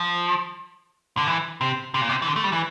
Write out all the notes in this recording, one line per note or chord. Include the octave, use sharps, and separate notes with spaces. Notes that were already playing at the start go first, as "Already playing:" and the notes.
Already playing: F3
D3
E3
C3
C3
A#2
C3
E3
D3
A3
G3
E3